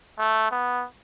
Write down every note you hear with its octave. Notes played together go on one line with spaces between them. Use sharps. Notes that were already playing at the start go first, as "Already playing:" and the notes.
A3
B3